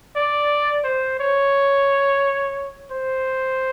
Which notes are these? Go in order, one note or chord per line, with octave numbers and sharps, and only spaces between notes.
D5
C5
C#5
C5